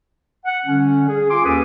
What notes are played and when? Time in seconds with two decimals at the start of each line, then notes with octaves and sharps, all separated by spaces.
0.46 F#5
0.66 D3 G3 C#4
1.08 G#4
1.30 F4 G#5 C6 D6
1.45 D#2 C#4 A4 B4 D#6